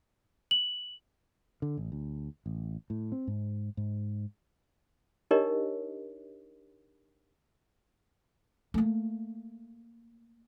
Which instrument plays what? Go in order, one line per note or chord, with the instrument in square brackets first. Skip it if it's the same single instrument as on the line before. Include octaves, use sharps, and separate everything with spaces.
[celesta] F#7
[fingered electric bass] D3
A1
D2
A1
A2
C4
G#2
G#2
[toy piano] D4 D#4 G4 A#4 C#5 D#5
[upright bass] A3 A#3